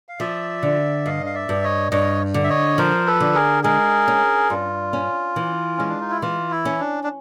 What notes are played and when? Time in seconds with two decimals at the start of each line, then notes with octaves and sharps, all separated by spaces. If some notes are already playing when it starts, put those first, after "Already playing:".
0.09 F5
0.19 F3 D5 E5
0.63 D3
1.05 G2 D#5 F5
1.26 F5
1.34 D5 E5
1.49 G2
1.64 C#5 D#5
1.91 G2 C#5 D#5
2.34 D3
2.44 E5
2.49 C#5 D#5
2.78 F3 A#4 C5
3.07 A4 B4
3.20 D3
3.35 G#4 A#4
3.63 G#3 G#4 A#4
4.08 C#4
4.50 G2 F4
4.93 C#4
5.36 E3
5.77 G#3 C#4
5.88 D4
6.01 D#4
6.10 E4
6.22 E3 F4
6.51 E4
6.65 C#4
6.80 D4
7.04 D4